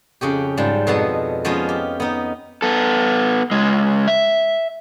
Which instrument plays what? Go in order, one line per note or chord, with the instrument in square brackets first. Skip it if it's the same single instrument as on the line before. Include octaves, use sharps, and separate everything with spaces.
[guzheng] F2 C#3 C#4 G4
G#2 F3 G3
F2 B2 G#3 B3 A5
F3 G#3 B3 C#4 F4 D#5
G4
B3 D#4
[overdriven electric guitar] B3 A4
C#2 G#3
E5